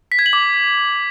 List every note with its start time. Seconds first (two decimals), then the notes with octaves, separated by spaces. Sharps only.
0.12 B6
0.19 G#6
0.26 F#7
0.33 D6